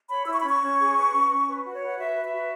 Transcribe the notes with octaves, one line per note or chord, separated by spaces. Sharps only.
C#5 B5
E4 E6
C#6
B5
C#4
C#6
C#4
G#4
B4
C#4
C#4
B4
F#4
C#5
B4
F#5
F#4 E5
B4
E5
F#4